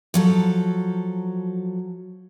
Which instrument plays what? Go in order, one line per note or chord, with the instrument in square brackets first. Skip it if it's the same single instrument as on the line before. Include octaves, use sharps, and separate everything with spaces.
[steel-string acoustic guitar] F3 F#3 A4